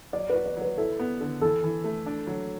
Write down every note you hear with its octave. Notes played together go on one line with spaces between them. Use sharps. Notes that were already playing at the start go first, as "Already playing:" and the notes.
F#3 D5
F#4 B4
D5
F#3 B4
E4 A4
B3
D3
E3 A4
E3
A3
D4
F#3